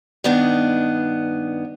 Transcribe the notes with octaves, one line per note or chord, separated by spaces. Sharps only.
G2 D#3 B3 D4 D#4